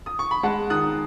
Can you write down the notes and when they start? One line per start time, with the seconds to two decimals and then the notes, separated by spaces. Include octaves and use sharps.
0.06 D#6
0.19 C#6
0.31 B5
0.43 G#3 F#5 A5
0.70 D#3 D#6 F#6